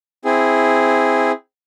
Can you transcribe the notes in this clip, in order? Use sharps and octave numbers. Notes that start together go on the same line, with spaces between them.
C4 E4 G#4